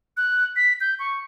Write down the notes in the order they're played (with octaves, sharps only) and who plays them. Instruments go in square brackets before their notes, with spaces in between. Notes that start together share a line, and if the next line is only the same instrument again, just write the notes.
[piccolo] F#6
B6
G6
C#6